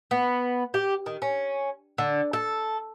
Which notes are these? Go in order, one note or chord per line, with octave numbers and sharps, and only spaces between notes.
B3
G4
D#3
C#4
D3
A4